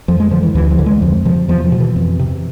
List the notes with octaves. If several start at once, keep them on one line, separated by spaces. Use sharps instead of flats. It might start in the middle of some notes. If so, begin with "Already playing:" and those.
F2 F3
G#3
D3 F3
E3
D2 E3
F3
D3
G#3
F2 F3
C3 F3
E2 F3
F3
B2
E3
F2
C3